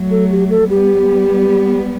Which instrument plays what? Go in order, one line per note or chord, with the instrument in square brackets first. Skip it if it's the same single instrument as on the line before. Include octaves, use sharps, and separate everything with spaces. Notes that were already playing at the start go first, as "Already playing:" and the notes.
Already playing: [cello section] F#3 A3
[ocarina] A4
G4
A4
[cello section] G3 B3 [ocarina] G4